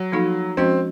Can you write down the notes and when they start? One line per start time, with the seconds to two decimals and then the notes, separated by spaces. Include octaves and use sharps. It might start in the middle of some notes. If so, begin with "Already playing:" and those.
Already playing: F#3
0.12 F3 A#3 D#4 F#4 A4
0.57 F3 G#3 C4 C#4 F#4